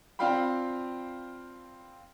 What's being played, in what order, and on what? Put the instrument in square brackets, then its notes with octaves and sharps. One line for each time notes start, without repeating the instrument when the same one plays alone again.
[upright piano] C4 D4 F4 F5 G5 B5